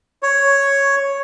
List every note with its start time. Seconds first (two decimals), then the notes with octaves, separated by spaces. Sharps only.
0.23 C#5